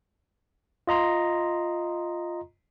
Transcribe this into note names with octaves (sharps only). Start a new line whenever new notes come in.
F4 D#5 A#5 C6